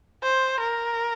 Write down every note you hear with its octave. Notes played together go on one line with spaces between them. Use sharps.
C5
A#4